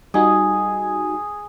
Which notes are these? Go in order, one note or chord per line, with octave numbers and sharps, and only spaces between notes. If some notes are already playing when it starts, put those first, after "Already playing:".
G3 D#4 F#4 G#4